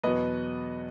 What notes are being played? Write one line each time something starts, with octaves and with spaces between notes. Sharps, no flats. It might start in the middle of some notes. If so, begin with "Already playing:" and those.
E2 B2 F#3 B3 B4 D#5